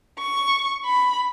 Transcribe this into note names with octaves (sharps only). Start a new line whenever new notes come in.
C#6
B5